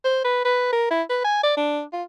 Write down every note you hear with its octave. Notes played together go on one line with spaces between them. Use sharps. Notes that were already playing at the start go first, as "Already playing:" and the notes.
C5
B4
B4
A#4
E4
B4
G#5
D5
D4
F4